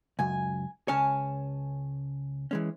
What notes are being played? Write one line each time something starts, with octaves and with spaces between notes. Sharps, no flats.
C#2 F#2 G#5
C#2 C#4 C#5 G#5 A5 F6
E3 G#3 C#4